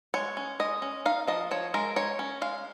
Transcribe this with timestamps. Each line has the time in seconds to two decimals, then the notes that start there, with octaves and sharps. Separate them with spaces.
0.14 G#3 C#5
0.37 C#4
0.60 G#3 D#5
0.82 C#4
1.06 D#4 F5
1.27 F3 D#5
1.51 F3 C#5
1.74 G#3 A#4
1.96 G#3 C#5
2.19 C#4
2.41 G#3 F5